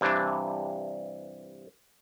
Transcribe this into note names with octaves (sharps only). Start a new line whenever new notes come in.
G2 C3 E3 D4